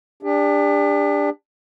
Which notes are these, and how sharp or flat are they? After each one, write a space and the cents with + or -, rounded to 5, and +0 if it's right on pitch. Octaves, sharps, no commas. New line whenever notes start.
D4 +0 G4 +40